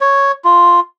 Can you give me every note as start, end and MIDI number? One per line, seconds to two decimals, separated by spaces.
0.01 0.32 73
0.45 0.80 65